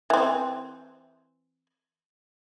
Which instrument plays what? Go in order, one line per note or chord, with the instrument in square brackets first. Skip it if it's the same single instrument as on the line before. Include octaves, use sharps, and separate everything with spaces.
[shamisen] E3 C4